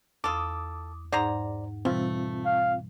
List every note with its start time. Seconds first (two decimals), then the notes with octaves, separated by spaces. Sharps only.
0.24 E2 F4 A4 D6 D#6
1.12 G#2 D#4 G#4 C5 D5 F#5 A#5
1.85 B2 E3 G3 A3 C4 F4
2.45 F5